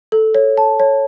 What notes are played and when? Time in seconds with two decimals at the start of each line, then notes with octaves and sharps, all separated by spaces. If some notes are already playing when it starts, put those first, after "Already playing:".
0.12 A4
0.35 C#5
0.57 A5
0.80 C#5